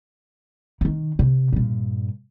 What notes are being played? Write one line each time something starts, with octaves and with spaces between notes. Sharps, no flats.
D#3 E3
C3
G2 A#2